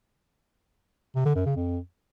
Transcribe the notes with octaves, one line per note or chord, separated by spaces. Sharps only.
C3
D3
F#2
C#3
F2